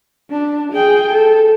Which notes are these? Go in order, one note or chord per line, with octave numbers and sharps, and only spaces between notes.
D4
G#4 G5
A4